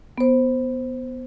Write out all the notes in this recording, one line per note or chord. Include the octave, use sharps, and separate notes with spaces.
B3 C5